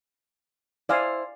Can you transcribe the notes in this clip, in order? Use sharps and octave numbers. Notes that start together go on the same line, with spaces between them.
E4 C5 D5 F5 G#5